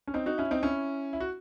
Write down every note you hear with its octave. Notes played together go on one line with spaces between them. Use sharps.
C#4
C4 D#4
D#4 F#4
C#4 E4
C4 D#4
C#4 E4
E4
F#4